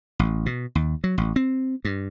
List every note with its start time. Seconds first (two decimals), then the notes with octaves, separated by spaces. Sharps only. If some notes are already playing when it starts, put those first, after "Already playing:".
0.19 A1
0.46 B2
0.75 D#2
1.04 F#3
1.18 A1
1.36 C4
1.85 G2